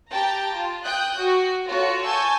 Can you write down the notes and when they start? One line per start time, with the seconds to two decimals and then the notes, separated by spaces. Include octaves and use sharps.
0.10 G4 G5 A5 A#5
0.53 F4
0.85 G5 D#6 F#6 G6
1.21 F#4
1.67 F4 F#4 A4 C#5
2.04 G#5 A5 C#6 E6 G6 G#6